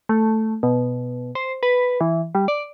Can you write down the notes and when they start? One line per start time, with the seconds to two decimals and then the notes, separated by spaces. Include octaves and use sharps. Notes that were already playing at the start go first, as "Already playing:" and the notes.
0.09 A3
0.63 B2
1.35 C5
1.63 B4
2.01 E3
2.35 G3
2.48 D5